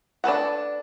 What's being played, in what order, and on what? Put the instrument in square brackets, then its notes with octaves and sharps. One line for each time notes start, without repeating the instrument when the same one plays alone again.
[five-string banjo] D4 A4 B4 F#5